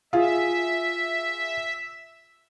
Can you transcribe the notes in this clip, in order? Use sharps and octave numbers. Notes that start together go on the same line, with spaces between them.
F4 G#4 E5